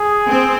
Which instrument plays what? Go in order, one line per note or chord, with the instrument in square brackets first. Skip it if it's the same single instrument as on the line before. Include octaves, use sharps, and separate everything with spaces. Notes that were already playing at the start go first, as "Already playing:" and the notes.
Already playing: [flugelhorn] G#4
[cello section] C4